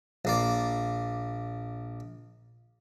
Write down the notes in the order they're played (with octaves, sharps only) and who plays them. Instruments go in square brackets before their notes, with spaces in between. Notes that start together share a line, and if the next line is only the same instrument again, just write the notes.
[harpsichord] A#1 A#3 D5